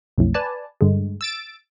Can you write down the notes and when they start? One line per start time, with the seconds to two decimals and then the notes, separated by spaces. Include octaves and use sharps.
0.18 B1 F2 A2
0.34 B4 D5 G#5 A5
0.81 G2 D3 G#3
1.21 E6 A6 D7